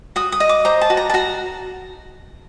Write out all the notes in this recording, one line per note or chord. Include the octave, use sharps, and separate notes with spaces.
F#4 D#6
D#6
D#5
D6
C5 A#5
A5
F#4
A#5
A5
F#4 A#5